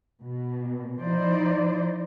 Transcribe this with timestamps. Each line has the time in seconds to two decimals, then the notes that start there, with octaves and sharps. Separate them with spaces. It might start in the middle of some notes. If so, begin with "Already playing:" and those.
0.22 B2
1.03 F3 D#4 E4 C5 D5